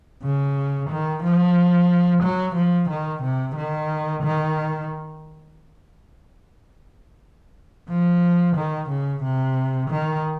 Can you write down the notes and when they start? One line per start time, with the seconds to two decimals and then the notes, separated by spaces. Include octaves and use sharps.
0.23 C#3
0.90 D#3
1.23 F3
2.23 F#3
2.56 F3
2.90 D#3
3.23 C3
3.56 D#3
4.24 D#3
7.90 F3
8.57 D#3
8.90 C#3
9.24 C3
9.90 D#3